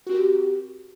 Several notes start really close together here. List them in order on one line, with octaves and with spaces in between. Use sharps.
F#4 C4 A#4 G4